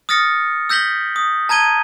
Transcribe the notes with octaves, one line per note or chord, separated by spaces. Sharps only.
D#6 F6 A6 A#6 C#7
E6 G6 A#6 B6 F#7 G7
D#6
A5 A#5 G#6 D#7 G7